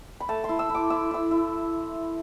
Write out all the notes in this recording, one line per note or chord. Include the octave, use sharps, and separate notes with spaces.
B5
A3 A5
C6
E4
E6
E4
D6
E4 E6
E4 E6
E4